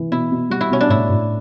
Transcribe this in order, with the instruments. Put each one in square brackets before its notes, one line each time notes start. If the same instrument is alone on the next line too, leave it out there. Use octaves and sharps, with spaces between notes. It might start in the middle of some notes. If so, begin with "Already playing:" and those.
Already playing: [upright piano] E3
[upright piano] B2 [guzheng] E4
[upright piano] B2
[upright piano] G3 [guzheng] F#4
[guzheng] E4
[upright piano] B2 [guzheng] C#4
[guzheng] D4
[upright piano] A2 [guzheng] E4
[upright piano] A2